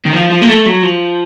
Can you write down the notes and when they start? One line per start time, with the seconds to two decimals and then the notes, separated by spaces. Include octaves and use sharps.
0.06 D#3
0.14 F3
0.30 F3
0.42 A#3
0.48 A3
0.66 F#3
0.83 F3